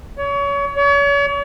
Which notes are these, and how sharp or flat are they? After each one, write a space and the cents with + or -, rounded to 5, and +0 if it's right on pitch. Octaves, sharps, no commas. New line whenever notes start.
C#5 +30
C#5 +40